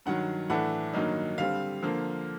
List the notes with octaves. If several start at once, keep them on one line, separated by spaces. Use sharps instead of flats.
G2 D#3 F#3 F#5
A2 E3 A3 D4 F#5
G2 D#3 F#3 A#3 D#4
D3 G3 C4 F5
D3 F3 A#3